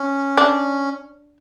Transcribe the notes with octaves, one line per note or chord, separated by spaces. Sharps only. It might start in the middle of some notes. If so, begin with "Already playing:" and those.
Already playing: C#4
D4